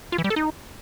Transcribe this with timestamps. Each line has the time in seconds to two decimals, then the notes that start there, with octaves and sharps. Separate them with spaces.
0.12 F4
0.18 E3
0.24 G3
0.30 A4
0.36 D#4